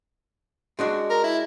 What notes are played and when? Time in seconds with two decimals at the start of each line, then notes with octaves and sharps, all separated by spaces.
0.79 G#3 D4 F#4
1.10 A#4
1.24 E4